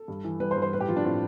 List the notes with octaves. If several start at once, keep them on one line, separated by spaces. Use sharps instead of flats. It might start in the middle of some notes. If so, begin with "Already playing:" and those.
Already playing: A4
G2
E3
G3 B4
C5
G2
C5
A2 B4
G4
F3 F4
D4
A2 C4